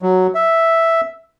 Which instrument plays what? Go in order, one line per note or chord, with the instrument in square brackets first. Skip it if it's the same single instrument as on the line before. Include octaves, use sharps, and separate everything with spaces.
[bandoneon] F#3
E5